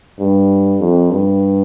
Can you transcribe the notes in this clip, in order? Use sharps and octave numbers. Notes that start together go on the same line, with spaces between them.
G2
F2
G2